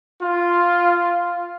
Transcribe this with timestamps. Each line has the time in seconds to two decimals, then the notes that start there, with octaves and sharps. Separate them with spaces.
0.22 F4